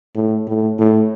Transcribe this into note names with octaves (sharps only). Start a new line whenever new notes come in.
A2
A2
A2